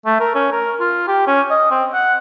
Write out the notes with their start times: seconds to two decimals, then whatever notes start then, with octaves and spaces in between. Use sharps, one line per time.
0.06 A3
0.20 A#4
0.35 C#4
0.52 A#4
0.80 F4
1.08 G4
1.27 C#4
1.50 D#5
1.71 C4
1.93 F#5